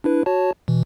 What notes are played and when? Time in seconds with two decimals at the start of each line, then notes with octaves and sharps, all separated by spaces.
0.04 D4 E4 B4
0.26 F#4 C#5 A5
0.68 B2 E3